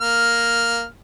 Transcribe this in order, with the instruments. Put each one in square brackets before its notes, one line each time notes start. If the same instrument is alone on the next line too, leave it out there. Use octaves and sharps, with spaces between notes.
[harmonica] A#3 F6